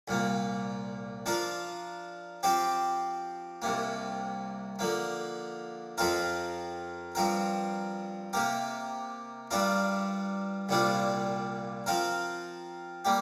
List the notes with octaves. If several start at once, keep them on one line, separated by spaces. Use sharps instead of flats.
C2 A#2 A#3
F3 D4 F4 A#4
F3 C4 G4 C5
C2 C3 A#3
D3 F3 A#3
F2 F3 C4 F4 A#4
G2 F3 C4 A#4
C3 A#3 G4 A#4
G2 G3 D4 F4 A#4
C2 A#2 G3 D4 F4
F3 C4 F4 A#4
G3 A#3 G4